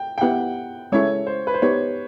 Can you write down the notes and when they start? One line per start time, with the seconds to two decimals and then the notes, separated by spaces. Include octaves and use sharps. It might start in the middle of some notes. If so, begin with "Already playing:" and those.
Already playing: G5
0.18 G5
0.21 B3 E4 G4 F#5
0.92 G#3 C#4 E4 A4 C#5
1.27 C5
1.47 B4
1.54 C5
1.62 B3 D#4 G4 C#5